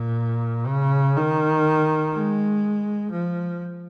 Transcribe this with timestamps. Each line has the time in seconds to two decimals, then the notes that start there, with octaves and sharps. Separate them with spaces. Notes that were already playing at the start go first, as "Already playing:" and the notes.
Already playing: A#2
0.67 C#3
1.16 D#3
2.14 G#3
3.11 F3